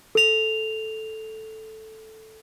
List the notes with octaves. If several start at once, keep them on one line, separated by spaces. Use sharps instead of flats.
A4 F7